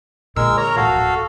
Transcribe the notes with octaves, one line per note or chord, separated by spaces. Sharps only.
A#2 D3 G#3 A#4 E6
A#4 C#5 A#5
D1 A#1 F#4 A4 F5